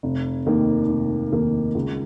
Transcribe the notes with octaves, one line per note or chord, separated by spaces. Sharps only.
F1
D#2 D#3 A#3 D#4
F1
D#2 D#3 A#3 D#4
C#2